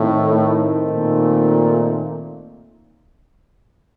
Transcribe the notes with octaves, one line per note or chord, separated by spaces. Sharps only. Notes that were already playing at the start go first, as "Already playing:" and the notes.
Already playing: A2 D#3 A3 C4 D#4
A#2